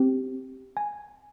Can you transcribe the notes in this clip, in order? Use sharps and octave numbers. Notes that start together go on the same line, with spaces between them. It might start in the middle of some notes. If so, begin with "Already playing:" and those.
Already playing: C4 G4
G#5